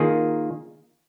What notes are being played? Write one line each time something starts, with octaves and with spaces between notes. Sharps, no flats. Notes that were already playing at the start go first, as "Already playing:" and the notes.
Already playing: D#3 A#3 F4 G#4